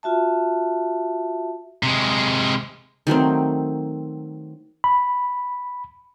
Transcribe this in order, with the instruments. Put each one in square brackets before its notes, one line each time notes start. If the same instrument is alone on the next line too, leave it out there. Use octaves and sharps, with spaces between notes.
[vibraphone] F4 F#4 E5 A5
[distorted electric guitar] C3 G#3
[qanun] D#3 F#3 A3 C4
[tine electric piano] B5